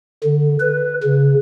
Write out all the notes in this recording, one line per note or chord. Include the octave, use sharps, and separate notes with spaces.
D3
B4
C#3